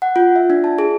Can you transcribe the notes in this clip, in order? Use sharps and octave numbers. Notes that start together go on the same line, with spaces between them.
F#5
F4
E5
D4
A5
G#4